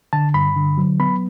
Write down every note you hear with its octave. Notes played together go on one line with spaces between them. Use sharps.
D3 A5
G2 B5
D3
F#3
B3 B5